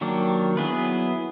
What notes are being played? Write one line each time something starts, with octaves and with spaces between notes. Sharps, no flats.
D#3 F#3 A#3 D4 G4
F#3 B3 E4 G#4 B4